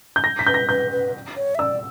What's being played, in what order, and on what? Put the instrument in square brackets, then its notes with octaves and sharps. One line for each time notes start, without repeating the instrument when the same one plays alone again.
[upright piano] G6
A#6
B6
[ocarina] B4 [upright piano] G6
[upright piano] A#6
[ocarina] B4 [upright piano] G6
[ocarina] B4
C#5
E5
[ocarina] D5 [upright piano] E6